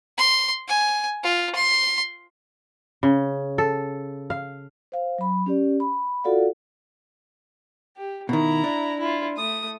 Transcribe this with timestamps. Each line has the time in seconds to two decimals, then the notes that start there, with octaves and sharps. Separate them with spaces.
0.18 C6
0.68 G#5
1.23 F4
1.55 C6
3.03 C#3
3.58 A4
4.30 F5
4.92 C5 F5
5.18 F#3 B5
5.46 C#4 G4 D5
5.80 B5
6.24 F4 F#4 A4 D5 F5 F#5
7.97 G4
8.29 B2 D#3 E4 A#5
8.64 D4
8.99 E4 F4
9.37 A3 D#6